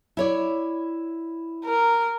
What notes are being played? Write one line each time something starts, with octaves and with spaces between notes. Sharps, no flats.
E4 C#5 D5
A#4